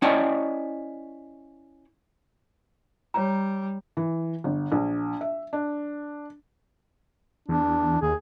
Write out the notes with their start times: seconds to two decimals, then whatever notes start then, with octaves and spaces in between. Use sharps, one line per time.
0.02 C#4 E4 D5 D#5 G5 A5
3.14 G3 C#5 A#5
3.97 E3
4.44 G1
4.72 A#1
5.21 E5
5.53 D4
7.49 E2 D4
8.02 D#2 G#4